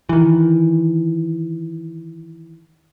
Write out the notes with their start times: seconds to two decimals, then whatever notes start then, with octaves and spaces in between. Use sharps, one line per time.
0.09 D#3 E3